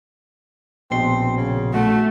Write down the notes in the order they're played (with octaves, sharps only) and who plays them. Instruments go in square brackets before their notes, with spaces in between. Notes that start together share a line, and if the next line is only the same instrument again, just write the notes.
[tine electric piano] A#1 B2 C6 [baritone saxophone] C4
[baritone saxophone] C#3
[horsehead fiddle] A3 [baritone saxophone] F#4